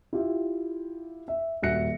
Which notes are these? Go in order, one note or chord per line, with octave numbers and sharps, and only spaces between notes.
E4 F4 G4 E5
E5
D#1 F#4 E5 F#6 A#6 C#7